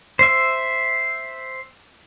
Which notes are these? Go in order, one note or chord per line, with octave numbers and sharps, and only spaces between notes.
C5 E5